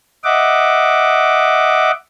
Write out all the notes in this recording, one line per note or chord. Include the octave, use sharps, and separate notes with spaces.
D#5 E5 F#5 D6